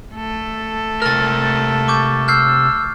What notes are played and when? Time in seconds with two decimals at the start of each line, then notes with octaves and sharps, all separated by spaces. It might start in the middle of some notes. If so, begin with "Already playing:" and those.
0.15 A3 A4
1.02 C3 A#4 F6 A6
1.88 C#6 D6 G6
2.28 E6 F6 G6 C7